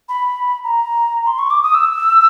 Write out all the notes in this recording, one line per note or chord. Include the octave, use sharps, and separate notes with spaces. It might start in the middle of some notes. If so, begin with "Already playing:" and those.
B5
A#5
C6
C#6
D6
D#6
E6